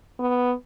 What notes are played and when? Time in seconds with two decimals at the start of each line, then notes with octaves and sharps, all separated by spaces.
0.19 B3